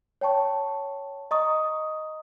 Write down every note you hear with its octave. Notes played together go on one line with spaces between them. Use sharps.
C#5 G5 A5 C#6
D#5 A#5 C#6 D#6